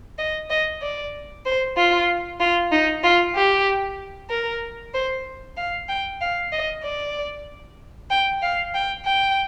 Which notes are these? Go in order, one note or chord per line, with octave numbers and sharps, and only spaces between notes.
D#5
D#5
D5
C5
F4
F4
D#4
F4
G4
A#4
C5
F5
G5
F5
D#5
D5
G5
F5
G5
G5